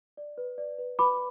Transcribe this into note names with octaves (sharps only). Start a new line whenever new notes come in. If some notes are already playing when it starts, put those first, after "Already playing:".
D5
B4
D5
B4
B4 B5 D6